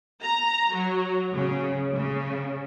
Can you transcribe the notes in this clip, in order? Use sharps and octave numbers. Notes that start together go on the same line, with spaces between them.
A#5
F#3
C#3
C#3